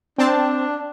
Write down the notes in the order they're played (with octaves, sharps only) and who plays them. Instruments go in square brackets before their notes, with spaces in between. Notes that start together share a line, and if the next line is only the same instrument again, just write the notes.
[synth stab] C4 A5 [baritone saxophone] D4